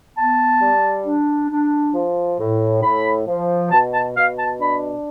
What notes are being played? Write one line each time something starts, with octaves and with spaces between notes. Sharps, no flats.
B3 A5
G3
D4
D4
F3
A2
A2 B5
F3
B2 A5
A5
B2 F5
A5
D4 B5